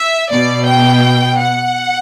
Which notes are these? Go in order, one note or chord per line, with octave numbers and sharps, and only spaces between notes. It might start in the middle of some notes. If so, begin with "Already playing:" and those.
Already playing: E5
B2 D5
G5
F#5